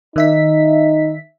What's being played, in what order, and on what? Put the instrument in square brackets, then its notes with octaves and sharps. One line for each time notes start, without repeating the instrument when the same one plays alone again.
[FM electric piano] D#3 E5 B6 [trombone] D#4